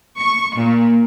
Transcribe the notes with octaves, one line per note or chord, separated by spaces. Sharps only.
C#6
A#2